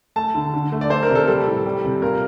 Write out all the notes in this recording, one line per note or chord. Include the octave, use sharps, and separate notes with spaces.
A3 A5
D3
D3
A3
D5
A3 C5
A#4
C3
A4
G3 A4
A2
G3
C3
A#2 A#4